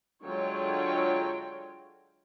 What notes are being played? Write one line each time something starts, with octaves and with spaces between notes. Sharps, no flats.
D3 F#3 G#3 F4 C#5 G5